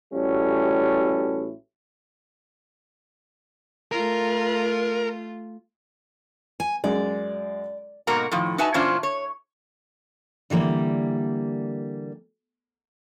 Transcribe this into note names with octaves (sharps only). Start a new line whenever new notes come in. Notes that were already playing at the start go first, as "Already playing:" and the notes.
A1 G3 C#4 E4 F#4 A4
A3 F4 A#4
G#5
F#2 G#3 D5
G#2 B2 A#3 F#4 A#4 A#5
A2 D#3 F3
D#4 F#4 B4 E5 G#5 A5
A#2 E3 C#4 D4 F4 C5
C#5
D3 E3 G3 A#3